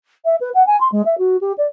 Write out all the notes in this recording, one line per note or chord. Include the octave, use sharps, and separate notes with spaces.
E5
B4
F#5
G#5
C6
G#3
E5
F#4
G4
D5